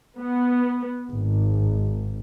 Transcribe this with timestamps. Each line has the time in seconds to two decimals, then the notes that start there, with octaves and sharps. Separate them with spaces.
0.19 B3
1.10 G#1